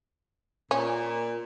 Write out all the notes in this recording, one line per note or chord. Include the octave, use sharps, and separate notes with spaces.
A#2 C#4